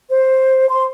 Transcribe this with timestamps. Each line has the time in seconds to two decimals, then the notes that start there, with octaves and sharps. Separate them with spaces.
0.10 C5
0.69 C6